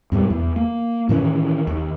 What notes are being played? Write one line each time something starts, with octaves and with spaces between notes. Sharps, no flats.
F2 G#2 B2 G3
E2
A#3
A2 D#3 E3 C#4
D#2